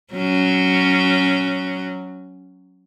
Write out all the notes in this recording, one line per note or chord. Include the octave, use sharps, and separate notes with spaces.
F#3 C#4